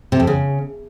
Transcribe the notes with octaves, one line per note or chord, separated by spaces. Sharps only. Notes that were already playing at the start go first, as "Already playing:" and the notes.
C3
F2
C#3